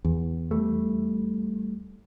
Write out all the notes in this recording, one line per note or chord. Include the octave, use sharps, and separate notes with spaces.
E2
E3 G3 A3